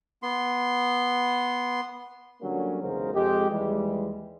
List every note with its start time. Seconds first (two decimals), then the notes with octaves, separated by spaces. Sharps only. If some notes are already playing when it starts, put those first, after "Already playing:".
0.23 B3 C6
2.42 D3 F#3 G3 A#3 C#4 D4
2.83 B1 E2 C#3 G#3 A#4 C5
3.15 F2 G#3 G4
3.50 D#2 E3 G3 G#3